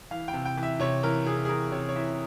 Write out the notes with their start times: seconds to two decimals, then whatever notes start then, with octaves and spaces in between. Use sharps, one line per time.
0.11 E3 F5
0.28 G5
0.33 C3
0.45 G5
0.57 E3
0.63 E5
0.80 C3 C#5
1.03 E3 A#4
1.26 C3 G#4
1.45 G#4
1.49 E3 A#4
1.72 C3 C#5
1.89 C#5
1.96 E3 E5